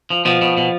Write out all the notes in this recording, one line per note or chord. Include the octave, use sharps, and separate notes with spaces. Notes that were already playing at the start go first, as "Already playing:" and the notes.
F3
B2 F3
B2
B2